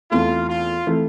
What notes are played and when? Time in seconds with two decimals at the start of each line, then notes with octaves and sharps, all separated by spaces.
0.11 E2 E3 A3 C4 F4
0.49 F4
0.86 E3 A3 C4